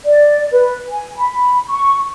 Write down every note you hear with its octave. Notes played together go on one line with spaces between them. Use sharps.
D5
B4
G#5
B5
C#6